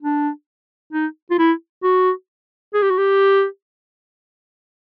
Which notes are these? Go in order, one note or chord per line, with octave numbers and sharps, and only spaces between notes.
D4
D#4
F4
E4
F#4
G#4
G4
F#4
G4